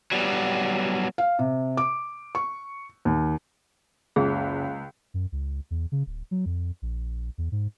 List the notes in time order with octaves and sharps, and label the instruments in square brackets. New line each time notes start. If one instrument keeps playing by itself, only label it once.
[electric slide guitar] F#3 G3 B3
[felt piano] F5
C3
D6
C#6
D#2
[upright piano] F#1 [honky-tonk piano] C#2 [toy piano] G#4
[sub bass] F#2
C#2
E2
C#3
D1
F#3
F2
A#1
E2
G#2